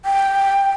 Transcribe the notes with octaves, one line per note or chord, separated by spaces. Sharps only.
G5